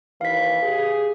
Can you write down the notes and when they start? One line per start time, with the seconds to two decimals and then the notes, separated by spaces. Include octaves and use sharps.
0.21 D#2 E3 B4 F5 B6
0.62 G4 G#4